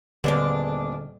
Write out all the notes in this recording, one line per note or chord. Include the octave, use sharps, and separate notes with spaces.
D#1 D3 G#3 A#3 B3 D4 D5